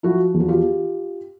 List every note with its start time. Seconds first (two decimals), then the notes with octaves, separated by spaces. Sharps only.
0.03 F3 E4 F#4
0.34 E2
0.40 F#4
0.48 F4 G4